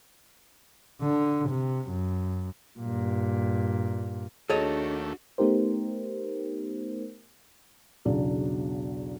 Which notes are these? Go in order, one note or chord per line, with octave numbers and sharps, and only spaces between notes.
D3
C3
F#2
G2 A#2
D#2 A3 D4 F#4 G#4 A4 C#5 D#5
A3 B3 D#4 G4 A#4 C5
B1 E2 C#3 F#3 D4